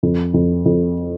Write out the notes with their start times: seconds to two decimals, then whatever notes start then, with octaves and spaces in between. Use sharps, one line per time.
0.03 F2
0.34 F2
0.65 F2